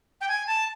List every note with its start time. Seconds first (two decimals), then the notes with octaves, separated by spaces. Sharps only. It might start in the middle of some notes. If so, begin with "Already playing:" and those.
0.21 G5
0.28 G#5
0.47 A5